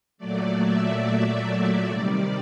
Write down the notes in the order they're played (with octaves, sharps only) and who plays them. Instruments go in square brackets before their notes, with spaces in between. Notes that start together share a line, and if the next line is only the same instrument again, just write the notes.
[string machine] A#2 F#3 A3 D5
E5
E5
C3 D#3 G3 D5